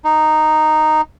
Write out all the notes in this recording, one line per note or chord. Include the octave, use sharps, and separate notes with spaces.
D#4